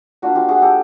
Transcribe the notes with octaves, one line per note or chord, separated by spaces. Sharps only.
A#3 D4 F4 F#4
F4 G4
F#4 G#4
G4 A4